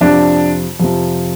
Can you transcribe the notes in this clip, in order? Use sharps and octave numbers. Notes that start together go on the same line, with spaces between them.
F2 C3 F3 D4
F2 C3 F3